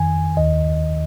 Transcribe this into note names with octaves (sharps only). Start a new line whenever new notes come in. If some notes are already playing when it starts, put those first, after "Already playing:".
Already playing: F2 D#3 G#5
D#2 D#3 D#5